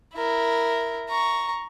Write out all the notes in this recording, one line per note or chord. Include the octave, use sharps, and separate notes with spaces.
E4 A#4
A#5 C#6